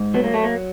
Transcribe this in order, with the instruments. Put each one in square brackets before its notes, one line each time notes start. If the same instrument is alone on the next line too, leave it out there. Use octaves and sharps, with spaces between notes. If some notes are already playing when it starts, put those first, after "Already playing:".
Already playing: [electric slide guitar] G#2
F#3 B3
A#3
A3
A#3